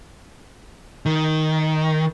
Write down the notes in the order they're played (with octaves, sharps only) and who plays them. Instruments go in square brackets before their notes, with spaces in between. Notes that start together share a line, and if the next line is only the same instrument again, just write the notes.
[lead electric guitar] D#3